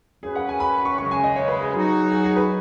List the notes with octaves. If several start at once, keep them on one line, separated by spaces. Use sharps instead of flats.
F#2 F#3 C#4 G#4 B4
F#5
G#5
B5
C#6
F#2 C#3 G#3 C#6
G#5
D#5
C#5
B4
G#4
F#3 D#4 F#4
G#4
G#4
B4